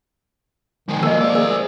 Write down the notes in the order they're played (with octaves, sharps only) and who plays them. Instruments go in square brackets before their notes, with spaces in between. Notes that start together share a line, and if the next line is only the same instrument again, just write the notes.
[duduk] D#3 [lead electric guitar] F3 G#3
[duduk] A#3 [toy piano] A#4 D#5
[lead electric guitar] C5 D5
[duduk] G#4 [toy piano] A#4